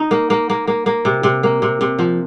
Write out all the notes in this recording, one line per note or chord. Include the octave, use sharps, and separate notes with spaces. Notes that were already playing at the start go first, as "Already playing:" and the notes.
Already playing: D#4
A#3
A#3
A#3
A#3
A#3
C3
C3
A#3
C3
C3
F3